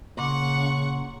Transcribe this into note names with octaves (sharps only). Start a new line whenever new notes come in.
A#2 C#3 F#5 C#6